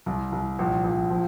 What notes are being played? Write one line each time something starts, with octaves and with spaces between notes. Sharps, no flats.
C2
C2
A#1
A#1
F3